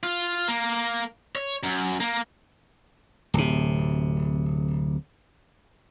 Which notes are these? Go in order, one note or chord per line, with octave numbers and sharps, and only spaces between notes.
F4
A#3
C#5
F#2
A#3
D1 C3